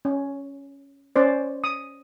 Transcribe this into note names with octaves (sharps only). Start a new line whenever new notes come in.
C#4
C#4 C5 D5
D#6